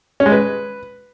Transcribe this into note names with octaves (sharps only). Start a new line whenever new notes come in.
C#4
G#3
B4